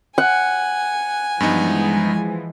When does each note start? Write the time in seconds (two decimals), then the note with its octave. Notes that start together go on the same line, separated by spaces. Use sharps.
0.18 F#5 G#5
1.40 G2 E3 F3 G#3 B3 D#4